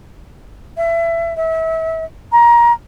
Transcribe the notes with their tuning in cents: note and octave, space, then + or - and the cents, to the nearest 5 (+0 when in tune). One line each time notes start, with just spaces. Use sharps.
E5 +25
E5 -30
A#5 +20